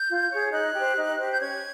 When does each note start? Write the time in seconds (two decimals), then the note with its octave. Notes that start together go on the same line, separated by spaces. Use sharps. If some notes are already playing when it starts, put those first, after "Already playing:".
Already playing: G6
0.09 F4
0.31 G#4 C#5
0.52 D#4 F#6
0.74 G4 C5
0.97 D#4
1.19 G4 C5
1.32 G6
1.41 C#4 G#6